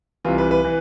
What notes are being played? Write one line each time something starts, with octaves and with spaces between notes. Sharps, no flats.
C2 C3 E3 F4
B4
B4
E3